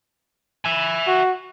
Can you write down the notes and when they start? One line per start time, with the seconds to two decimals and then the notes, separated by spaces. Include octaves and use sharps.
0.65 E5 G#5
1.07 F#4